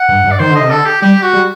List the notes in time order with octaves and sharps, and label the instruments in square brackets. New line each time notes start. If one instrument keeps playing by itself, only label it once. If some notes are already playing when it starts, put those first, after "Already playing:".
Already playing: [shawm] F#5
[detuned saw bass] G2
G2
[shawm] D5
[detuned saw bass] D#3 [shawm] C5
[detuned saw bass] D3
[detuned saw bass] C3 [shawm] D#5
[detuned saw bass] D3 [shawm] A4
[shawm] G4
[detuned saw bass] G3 [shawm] G4
[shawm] F#4
[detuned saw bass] G3